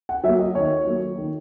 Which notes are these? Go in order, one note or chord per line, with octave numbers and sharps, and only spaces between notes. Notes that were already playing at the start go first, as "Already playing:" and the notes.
F#5
F#3 A#3 E5
D#5
D#3 C#5
F#3 A#3
D#3